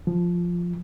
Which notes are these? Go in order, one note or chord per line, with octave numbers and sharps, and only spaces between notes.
F3